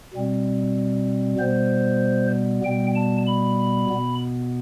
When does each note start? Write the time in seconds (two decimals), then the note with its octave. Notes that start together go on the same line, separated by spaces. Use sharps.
0.14 B2 G3 C4
1.39 B2 G3 B3 C5
2.64 B2 G3 B3 G5
2.96 A5
3.27 B5
3.90 B2 B3